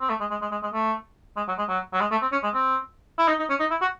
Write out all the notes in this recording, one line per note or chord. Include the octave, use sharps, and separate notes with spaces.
C4
A3
G#3
G#3
G#3
G#3
G#3
A3
G#3
F#3
G#3
F#3
F#3
G#3
A3
C4
C#4
G#3
C4
E4
D#4
D#4
C#4
D#4
E4
F#4